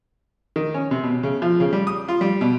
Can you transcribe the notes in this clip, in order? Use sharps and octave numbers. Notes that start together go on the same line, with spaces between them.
D#3
C#4
C3
B2
C#3
F3
C#3
G3
D#6
F4
G3
B2